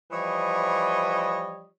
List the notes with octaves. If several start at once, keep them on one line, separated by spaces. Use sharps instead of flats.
E3 F3 G3 C#5 D#5